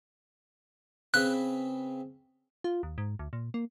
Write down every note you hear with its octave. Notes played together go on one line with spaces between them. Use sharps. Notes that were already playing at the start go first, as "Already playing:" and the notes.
C#3 C4 B4 F#6
F4
D#2
G#2
D2
A#2
A#3